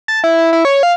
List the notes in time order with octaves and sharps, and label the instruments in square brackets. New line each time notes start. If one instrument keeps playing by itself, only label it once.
[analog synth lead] A5
E4
E4
E4
C#5
F5